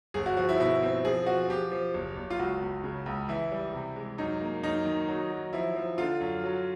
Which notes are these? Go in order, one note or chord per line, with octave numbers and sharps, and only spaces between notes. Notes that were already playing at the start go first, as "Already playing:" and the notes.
G1 G#4
F#4
F3 F#4
E4
B2 E4
C4
F3 G#4
F3 F#4
F3 G4
F3
F#1
F#1
F4
C#2 F#4
C#2
C#3
C#2
E3 E4
G3
C3
G#3
F#2 D#4
A#3
F#2 D#4
D#3
F#3
F#3
F3 E4
F3
D3 F4
F#2
F#3